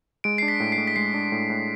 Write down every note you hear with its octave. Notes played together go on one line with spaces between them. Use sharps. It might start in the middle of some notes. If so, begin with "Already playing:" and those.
G#3 D7
D4 C7
B6
A2
C7
A2
B6
G#3 C7
D4
A2
A2